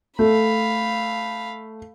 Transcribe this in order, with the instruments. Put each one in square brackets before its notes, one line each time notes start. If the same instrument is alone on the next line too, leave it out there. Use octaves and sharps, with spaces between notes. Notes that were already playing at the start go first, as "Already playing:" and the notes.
[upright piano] A3 [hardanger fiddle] F5 B5